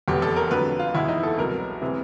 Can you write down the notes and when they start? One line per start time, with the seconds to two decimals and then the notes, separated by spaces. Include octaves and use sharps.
0.08 F1 E2 B2 G4
0.22 A4
0.36 A#4
0.51 F2 D3 F#3 B4
0.79 F4
0.95 E2 B2 G#3 E4
1.08 D#4
1.23 A4
1.38 C2 B2 F#3 A#4
1.82 C3 E3 G#3